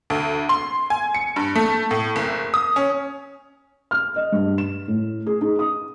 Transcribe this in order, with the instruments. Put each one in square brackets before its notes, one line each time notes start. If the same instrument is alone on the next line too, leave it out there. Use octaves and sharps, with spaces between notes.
[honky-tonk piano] D2
C6
G#5
C#7
G2
A3
A2
F#1
D#6
C#4
[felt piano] F6
D#5
G2
E7
A2
G#4
D#4
D#6